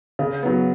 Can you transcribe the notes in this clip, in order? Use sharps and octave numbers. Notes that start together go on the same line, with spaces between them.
C#3
F#3 B3